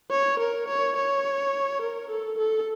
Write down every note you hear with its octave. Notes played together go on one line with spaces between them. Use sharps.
C#5
A#4
C#5
C#5
A#4
A4
A4